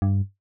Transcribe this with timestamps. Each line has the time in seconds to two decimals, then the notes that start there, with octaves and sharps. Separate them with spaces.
0.02 G2